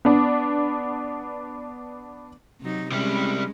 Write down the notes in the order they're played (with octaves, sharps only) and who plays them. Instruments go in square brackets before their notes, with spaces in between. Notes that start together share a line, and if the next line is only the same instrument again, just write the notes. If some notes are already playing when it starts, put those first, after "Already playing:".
[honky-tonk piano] B3 D4
[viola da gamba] C3 F#3 D#4
[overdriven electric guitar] C3 G3 [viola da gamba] G#3 C#4